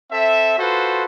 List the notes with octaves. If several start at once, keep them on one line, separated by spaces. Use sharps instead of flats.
C4 A4 E5
F4 F#4 A4 B4 C5